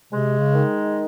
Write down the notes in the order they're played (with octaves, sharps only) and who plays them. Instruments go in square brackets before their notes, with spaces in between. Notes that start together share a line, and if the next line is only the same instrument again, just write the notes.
[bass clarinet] C3 [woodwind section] G#3
[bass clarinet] C#3
[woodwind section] D#3